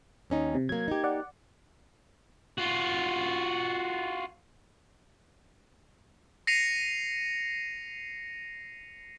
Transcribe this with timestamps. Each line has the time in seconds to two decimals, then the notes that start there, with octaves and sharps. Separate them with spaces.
0.30 D#2 C#4 D#4
0.55 C3
0.69 F#3 A#3 G#6
0.88 D#4 G4
1.04 D5 F#5
2.58 F4 F#4
6.47 A#6 C7 C#7 D#7 F7